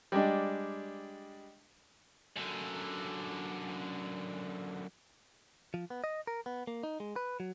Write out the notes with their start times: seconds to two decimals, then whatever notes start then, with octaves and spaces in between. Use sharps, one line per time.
0.12 G3 G#3 D4
2.36 F#2 D3
5.74 F3
5.90 B3
6.04 D#5
6.27 A#4
6.46 B3
6.67 A#3
6.83 D#4
7.00 G#3
7.16 B4
7.40 F#3